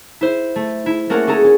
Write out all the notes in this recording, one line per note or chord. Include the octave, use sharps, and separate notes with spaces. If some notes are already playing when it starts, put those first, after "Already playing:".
E4 C5
A3
E4
A3 A#3 C#4 F#4 A#4 F#5
C#4 G#4 A4 A#5
C#4